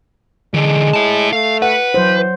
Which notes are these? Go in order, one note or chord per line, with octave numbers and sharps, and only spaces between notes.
D3 E3 G#3
E4 A5
A3 F5
B4 F#5
E3 F#3 C5